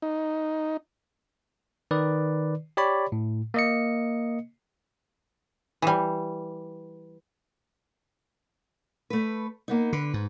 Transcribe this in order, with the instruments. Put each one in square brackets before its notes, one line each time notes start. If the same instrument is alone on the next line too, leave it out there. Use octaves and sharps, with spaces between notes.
[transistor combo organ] D#4
[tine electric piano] D#3 B4 D5
G4 C#5 D5 B5
A2
A#3 D#5 C#7
[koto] E3 G3
[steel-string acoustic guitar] A3 B4
A#3 B3 D#4
[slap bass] D3 [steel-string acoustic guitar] B4
[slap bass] G#2